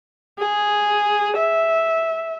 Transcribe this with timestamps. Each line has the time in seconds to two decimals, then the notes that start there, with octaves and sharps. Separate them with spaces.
0.39 G#4
1.37 E5